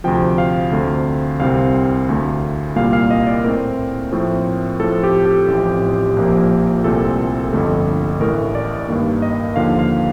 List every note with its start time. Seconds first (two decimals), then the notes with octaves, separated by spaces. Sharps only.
0.04 D2 C3 F3 G5
0.38 F5
0.72 D2 D3 A3 C4
1.40 C2 C3 G3 C4 F5
2.09 D2 D3 A3
2.76 C2 A#2 G3 A#3 F5
2.93 F5
3.11 D#5
3.27 D5
3.44 A2 A3 C4 A#4
4.12 A2 F3 A3 C4
4.80 A2 F3 C4 A4
5.03 G4
5.25 G4
5.48 A1 A2 F3 C4
6.17 A#1 A#2 F3 A#3
6.84 C2 A#2 A3 C4 A4
7.52 G1 F2 D3 A3
8.20 A1 A2 A3 A#4
8.55 D5
8.89 G2 D#3 A#3
9.22 D#5
9.56 D#2 D3 F3 A#3 F5
9.79 F5